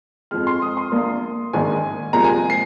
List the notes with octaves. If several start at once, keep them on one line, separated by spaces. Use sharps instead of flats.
F2 F3 G#3 F6
C6
D#6
C6
A#1 A#2 A#3
A#1 G#2 D#3 G#3 G#5
C2 A#2 F3 G#3 A#5
G#5
C7